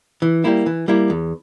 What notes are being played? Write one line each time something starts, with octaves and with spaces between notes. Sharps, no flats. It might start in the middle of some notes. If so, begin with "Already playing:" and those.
E3
G3 A#3 E4
E3
G3 A#3 E4
E2